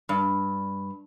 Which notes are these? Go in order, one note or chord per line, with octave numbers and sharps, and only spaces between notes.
G2